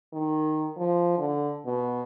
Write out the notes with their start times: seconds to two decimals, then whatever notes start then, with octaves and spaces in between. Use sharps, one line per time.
0.13 D#3
0.77 F3
1.18 D3
1.65 B2